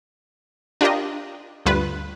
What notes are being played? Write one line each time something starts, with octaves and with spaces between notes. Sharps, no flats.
D4 F4 G4 A#4 D#5
D2 G2 F4 B4